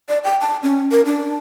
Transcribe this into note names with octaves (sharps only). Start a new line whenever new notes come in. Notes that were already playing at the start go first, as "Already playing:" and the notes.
D5
G5
A5
C#4
A#4
D4